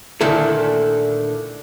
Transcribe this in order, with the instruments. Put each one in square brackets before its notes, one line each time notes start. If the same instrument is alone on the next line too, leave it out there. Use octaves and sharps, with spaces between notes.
[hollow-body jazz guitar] A#2 D3 D#3 A3 E4 A4